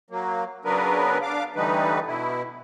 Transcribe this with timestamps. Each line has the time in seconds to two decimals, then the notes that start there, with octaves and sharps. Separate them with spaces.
0.10 F#3 A#3
0.65 C#3 F#3 B3 D4 A#4 B4
1.22 D4 F5 D6
1.56 D3 E3 G3 A3 D#4 B4
2.07 B2 E4